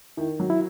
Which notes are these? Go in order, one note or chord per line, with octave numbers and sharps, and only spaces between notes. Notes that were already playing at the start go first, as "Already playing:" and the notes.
D#3 E4
F#3
E4